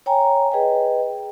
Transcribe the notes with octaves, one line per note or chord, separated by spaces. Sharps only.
C#5 G5 G#5 A#5
G#4 B4 D#5 G5